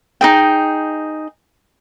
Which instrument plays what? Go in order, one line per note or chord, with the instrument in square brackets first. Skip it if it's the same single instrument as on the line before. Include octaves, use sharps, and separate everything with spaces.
[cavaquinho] D#4 G#4 G5